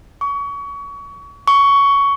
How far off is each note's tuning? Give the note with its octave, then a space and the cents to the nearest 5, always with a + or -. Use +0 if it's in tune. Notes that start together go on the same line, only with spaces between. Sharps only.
C#6 +30
C#6 +15